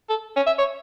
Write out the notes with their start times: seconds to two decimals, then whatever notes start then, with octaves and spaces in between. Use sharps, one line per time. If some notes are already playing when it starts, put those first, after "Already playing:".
0.09 A4
0.36 C#4
0.46 E5
0.58 C#5